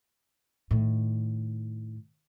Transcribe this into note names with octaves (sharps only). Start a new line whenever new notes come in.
A2 D#3